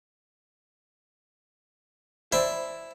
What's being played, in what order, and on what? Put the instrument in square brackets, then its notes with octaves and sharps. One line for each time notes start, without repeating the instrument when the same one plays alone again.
[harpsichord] E4 [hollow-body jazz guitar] C5 D5 A5